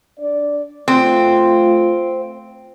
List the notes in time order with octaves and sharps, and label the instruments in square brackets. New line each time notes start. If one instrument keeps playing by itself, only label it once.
[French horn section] D4 D5
[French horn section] A3 F4 [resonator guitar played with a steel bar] C4